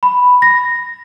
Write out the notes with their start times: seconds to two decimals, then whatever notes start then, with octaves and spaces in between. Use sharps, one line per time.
0.03 B5
0.42 A#6